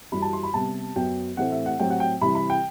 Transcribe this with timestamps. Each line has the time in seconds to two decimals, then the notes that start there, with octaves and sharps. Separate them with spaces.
0.12 F#2 E3 G3 B5
0.22 A5
0.33 C6
0.43 B5
0.54 C3 G3 B3 A5
0.96 F#2 F#3 B3 G5
1.37 A2 E3 A3 C4 F#5
1.52 E5
1.66 F#5
1.79 A2 F#3 C4 G5
1.90 F#5
2.00 G5
2.22 C3 E3 G3 B5
2.35 B5
2.50 G5